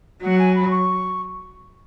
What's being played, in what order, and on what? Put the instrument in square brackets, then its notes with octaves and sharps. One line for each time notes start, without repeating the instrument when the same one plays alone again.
[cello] F#3 [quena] F#5
[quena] G#5
B5
C#6